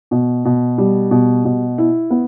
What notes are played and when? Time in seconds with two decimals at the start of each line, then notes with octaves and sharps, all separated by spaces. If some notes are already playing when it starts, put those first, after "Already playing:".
0.11 B2
0.45 B2
0.78 G3
1.11 B2
1.45 B2
1.78 E4
2.10 B3